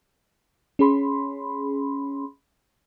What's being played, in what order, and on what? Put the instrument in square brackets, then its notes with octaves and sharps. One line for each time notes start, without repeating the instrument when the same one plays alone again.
[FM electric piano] C#4 G#4 B5 C6